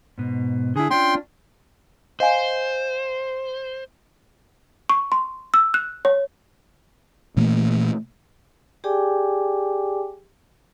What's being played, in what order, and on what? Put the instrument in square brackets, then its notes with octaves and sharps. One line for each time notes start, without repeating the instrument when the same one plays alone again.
[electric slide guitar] G#2 B2
[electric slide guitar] D3 E4 [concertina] G#4
[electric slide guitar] C#4 D4 F4 [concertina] G5 C6
[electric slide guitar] C5 [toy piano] D#5 F5 G#5
[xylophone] C#6
C6
E6
F#6
C#5
[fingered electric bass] A#2 E3 A3 A#3
[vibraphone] G4 G#4 D5 G5 G#5 D6